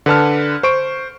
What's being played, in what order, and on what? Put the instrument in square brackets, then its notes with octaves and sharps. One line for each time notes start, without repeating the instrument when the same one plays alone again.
[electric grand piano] D3 B4 A5 F6
C5 C#6 D7